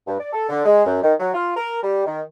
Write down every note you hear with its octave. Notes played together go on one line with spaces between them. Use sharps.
G2
D5
A4
D3
G#3
F#2
D#3
F#3
F4
A#4
G3
D#3